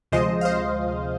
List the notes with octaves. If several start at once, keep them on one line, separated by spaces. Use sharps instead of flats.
D2 C3 F3 G#3 C5 D#5
F5
C5 D#5